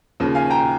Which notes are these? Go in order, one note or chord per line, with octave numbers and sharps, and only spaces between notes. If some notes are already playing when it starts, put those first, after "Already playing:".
D#2 C#3 F3
F5 G#5
G5 A#5